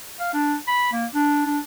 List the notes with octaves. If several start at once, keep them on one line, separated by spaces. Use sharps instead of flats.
F5
D4
B5
A#3
D4
D4